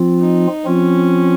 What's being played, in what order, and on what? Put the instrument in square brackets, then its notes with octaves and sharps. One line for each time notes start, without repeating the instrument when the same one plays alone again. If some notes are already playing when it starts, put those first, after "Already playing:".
Already playing: [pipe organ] F3 C4 F4
[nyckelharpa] D#4
[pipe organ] F3 C4 F4 [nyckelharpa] C#4